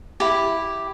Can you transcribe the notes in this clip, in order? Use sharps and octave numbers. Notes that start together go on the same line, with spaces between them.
E4 G4